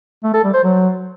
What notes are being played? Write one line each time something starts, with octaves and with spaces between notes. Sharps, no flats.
A3
A4
G3
C5
F#3